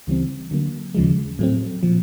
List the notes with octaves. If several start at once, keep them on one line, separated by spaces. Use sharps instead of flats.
D2 C#3 E3 G3 C4
D3 F#3 A#3
D#2 C#3 F3 G#3
A2 F#3 A3 C4
A#2 F3